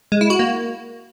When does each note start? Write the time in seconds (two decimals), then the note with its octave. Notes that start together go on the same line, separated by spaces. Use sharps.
0.12 G#3
0.21 E4
0.30 F#4
0.39 A#3